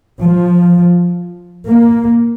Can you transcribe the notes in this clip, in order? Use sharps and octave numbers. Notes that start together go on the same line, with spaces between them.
F3
A#3